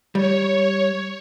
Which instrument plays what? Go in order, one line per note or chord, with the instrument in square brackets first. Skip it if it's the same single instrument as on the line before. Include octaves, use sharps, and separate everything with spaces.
[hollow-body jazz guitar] G3 [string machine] C#5